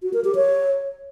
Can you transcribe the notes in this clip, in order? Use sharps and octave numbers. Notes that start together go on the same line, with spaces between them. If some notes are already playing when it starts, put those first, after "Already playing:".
F#4
A#4
G4
C#5